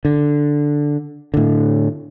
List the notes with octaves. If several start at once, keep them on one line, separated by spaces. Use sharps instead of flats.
D3
A2 D3